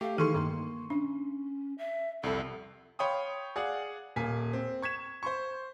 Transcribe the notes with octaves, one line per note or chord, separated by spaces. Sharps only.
A3 G4 F5
D#3 E3 D#4 G#4 A4 C6 C#6 D#7
G2 D#3 A#3
C#4 D4
E5
C2 F2 A4
C#5 F5 G5 B5 C6 D#6
G#4 D5 F5 F#5
D#1 A#3 G#5 B6
C4
C#6 G#6 B6 E7
C5 C6 C#6